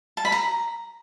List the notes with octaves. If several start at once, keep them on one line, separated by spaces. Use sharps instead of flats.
A5
B5
A#5